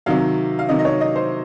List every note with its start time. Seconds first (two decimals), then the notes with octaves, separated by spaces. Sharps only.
0.06 C3 D#3 F#3 F5
0.59 F5
0.69 C3 D#3 F#3 D#5
0.79 D#5
0.85 C#5
1.01 D#5
1.16 C5